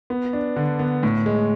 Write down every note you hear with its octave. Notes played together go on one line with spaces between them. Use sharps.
B3
D4
D3
B3
A2
G#3